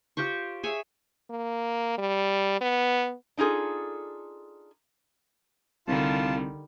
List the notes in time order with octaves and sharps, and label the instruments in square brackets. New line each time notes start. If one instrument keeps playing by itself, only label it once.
[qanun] F4 G4 C5 C#6
G#4 C#5 E5 G#5
[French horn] A#3
G3
B3
[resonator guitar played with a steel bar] D4 D#4 F4 G#4 A4
[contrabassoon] C2 [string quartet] D3 D#3 G3 [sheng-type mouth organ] F4 A5